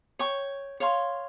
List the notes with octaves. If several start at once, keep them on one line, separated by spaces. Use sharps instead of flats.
C#5 G5 C#6
C#5 F5 C6